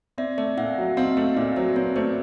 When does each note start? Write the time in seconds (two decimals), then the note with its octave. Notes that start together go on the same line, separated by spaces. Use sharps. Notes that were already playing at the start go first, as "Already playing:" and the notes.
0.18 C4 D5 E5
0.38 A3 D5 E5
0.57 A#2 E5 F#5
0.78 F#3
0.97 C4 D#5 F5
1.17 A3 D#5 F5
1.36 A#2 D5 E5
1.56 F#3 C5 D5
1.76 C4 B4 C#5
1.96 A3 C5 D5